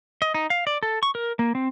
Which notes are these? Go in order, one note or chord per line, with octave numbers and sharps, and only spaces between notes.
D#5
D#4
F5
D5
A4
C#6
A#4
A#3
C4